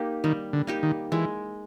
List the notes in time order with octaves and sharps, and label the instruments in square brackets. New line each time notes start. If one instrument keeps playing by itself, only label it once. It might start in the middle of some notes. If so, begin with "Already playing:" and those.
Already playing: [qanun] A#3 D#4 G4
[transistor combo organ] D#3 [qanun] G3
[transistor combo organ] D3
[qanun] A#3 D#4 G4
[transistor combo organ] D#3
[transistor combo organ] E3 [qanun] G#3